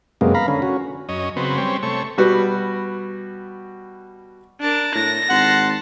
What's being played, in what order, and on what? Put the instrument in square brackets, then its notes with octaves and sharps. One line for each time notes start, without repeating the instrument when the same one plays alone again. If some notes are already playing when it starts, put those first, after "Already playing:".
[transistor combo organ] F#2 C3 G#3 A#3 B3
F5 A#5 B5
D3 C#4
C#4 F#4
F#2 C#4 D#5
C#3 F#3 B3 C4
G3 C4 C#4
C3 A3 C#5
[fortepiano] B2 G3 F#4 B4 F#5
[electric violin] D4 [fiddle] A#4 A5
[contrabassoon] A2 [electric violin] A#6
[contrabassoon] G#1 [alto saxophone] F#5 [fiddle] A5 C6